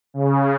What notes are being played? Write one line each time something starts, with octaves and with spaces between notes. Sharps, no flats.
C#3